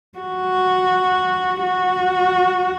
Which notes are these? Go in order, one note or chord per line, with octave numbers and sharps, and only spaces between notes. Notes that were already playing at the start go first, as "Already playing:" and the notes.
F#4
F#4